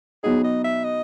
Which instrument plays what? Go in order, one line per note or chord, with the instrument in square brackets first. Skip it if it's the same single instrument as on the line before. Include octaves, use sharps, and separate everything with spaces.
[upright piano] B2 F#3 B3 D#4 [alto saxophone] G#4
[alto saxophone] D#5
E5
D#5